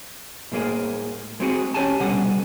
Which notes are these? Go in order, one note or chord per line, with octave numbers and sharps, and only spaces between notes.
A2 G#3 A#3 G#4
G#3 C4 F#4 G#4
C#4 G4 G#5 A5
C2 B2 D3 G3 F#5 G#5